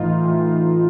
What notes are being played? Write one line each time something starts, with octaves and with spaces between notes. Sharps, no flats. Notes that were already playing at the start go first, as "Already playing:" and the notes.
Already playing: A2 E3 D#4 F4
A2 E3